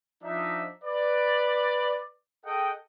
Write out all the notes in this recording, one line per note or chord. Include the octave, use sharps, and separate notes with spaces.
F3 D4 D#4 E5
B4 D5
G#4 A4 D#5 F#5 G5